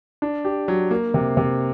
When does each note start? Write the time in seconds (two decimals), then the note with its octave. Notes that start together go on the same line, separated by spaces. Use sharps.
0.22 D4
0.45 G4
0.68 F#3
0.91 A#3
1.14 C3
1.37 C3